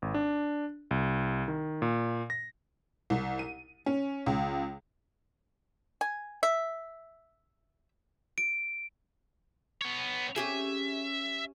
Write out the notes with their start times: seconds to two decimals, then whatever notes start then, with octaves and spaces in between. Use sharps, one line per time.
0.02 G#1
0.14 D4
0.91 C2
1.48 D#3
1.82 A#2
2.30 A#6
3.10 C2
3.39 D#7
3.86 C#4
4.26 C#2
6.01 G#5
6.43 E5
8.38 D7
9.81 B3 C#5
10.36 C#4 G4 G#4 E5